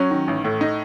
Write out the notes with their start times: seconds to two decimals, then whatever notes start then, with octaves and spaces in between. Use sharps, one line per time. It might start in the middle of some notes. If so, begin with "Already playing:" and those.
Already playing: F#3 C#4
0.11 D#3
0.28 A1
0.44 A2
0.61 D#4